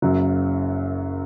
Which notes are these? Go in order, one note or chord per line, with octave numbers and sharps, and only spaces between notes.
F#1 F#2 F#3